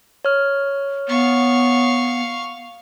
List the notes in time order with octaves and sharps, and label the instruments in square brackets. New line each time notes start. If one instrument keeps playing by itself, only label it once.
[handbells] C#5 F6
[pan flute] B3 [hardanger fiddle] F5 C#6